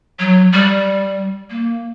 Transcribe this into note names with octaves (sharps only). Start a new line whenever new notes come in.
F#3
G3
A#3